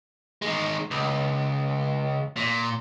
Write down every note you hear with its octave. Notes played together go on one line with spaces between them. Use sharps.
D#3 G#3
C#2
A#2